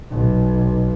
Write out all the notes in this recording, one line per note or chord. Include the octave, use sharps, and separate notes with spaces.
B1